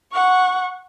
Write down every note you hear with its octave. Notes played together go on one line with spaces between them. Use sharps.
F#5 C#6